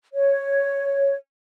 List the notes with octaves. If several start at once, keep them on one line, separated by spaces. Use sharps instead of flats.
C#5